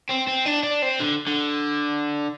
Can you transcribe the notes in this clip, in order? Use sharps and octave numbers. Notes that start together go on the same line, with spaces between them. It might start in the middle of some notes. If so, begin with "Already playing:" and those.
C4
C4
D4
D4
C4
D3
D3